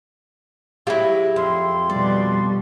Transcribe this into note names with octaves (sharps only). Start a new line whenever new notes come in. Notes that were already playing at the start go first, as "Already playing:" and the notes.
F#3 G#3 E4 F4 G4
F2 C6
B2 G3 D5